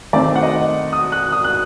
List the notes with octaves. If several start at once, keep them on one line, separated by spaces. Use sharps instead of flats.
D#3 A3 C4 D5
F#5
D#5
D#6
F#6
D#6
F#6